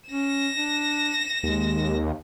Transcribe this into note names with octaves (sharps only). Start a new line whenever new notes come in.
C#4 A#6 E7
D4
D#2 G#3